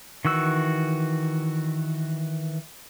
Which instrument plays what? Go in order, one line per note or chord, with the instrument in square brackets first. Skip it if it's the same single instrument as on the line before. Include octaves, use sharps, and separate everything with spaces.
[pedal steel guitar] D#3 E3 F#4 E6